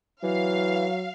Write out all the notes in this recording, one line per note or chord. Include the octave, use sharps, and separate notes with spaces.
E3 F#3 F5